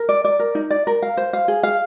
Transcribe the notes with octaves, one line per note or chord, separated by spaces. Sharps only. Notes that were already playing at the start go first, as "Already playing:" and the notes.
Already playing: A#4
D5
D5
A#4
D#4
D5
A#4
F5
C5
F5
G#4
F5